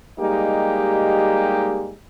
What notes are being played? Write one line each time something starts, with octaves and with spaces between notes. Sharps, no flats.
G3 G#3 A#3 D#4 G4